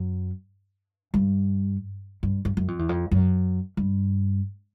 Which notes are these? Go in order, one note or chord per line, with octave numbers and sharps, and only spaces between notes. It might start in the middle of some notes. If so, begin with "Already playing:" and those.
Already playing: F#2
G2
G2
G2
F#2
F2
E2
F2
F#2
G2